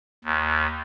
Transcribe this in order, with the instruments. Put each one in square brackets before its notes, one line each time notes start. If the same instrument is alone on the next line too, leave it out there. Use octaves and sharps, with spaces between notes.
[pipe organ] D#2